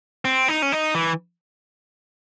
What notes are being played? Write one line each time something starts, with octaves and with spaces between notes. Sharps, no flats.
C4
D#4
C#4
D#4
E3